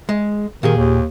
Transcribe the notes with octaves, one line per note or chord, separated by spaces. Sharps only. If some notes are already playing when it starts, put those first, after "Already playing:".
G#3
A#2 D#3 G4 G#4
D#2